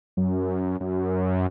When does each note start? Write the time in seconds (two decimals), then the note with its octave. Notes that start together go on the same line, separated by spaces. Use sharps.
0.17 F#2
0.80 F#2